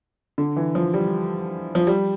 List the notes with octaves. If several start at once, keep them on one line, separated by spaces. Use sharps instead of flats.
D3
E3
F3
G3
F3
G3